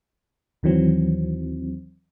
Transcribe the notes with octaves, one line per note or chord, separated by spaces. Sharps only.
D#2 D#3 E3 F#3 C4